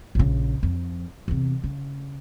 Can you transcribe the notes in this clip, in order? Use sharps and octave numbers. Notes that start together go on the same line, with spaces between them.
A#1 C#3
F2
E2 C3
C#3